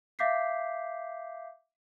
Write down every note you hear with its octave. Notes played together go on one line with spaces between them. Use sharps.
E5 F5 D6 G6 B6 C7